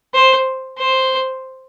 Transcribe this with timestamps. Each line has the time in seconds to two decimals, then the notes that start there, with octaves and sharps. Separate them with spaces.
0.14 C5
0.78 C5